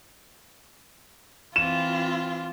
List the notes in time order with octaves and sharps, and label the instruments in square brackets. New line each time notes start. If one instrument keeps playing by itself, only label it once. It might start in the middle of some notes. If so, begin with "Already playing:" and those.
[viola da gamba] E3 C4 [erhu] F4 [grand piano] E7